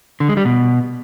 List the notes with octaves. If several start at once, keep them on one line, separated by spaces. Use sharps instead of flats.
D3
G#3
G3
B2